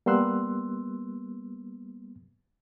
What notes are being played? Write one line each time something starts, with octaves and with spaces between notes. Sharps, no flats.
G3 A#3 B3 C6 E6 F#6